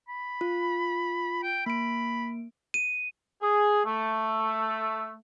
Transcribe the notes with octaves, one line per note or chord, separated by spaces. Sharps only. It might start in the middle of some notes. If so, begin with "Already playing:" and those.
B5
F4
G5
A#3 B5 D7
D#7
G#4
A3